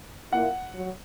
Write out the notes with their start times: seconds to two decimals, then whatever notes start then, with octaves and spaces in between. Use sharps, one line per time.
0.32 A#2 A#3 E4 F#5
0.74 F#3